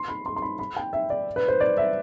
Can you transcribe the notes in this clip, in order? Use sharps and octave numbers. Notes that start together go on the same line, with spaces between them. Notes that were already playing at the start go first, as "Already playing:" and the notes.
Already playing: C6
B5
C6
C6
B5
B5
G5
E5
D5
B4
C5
D5
E5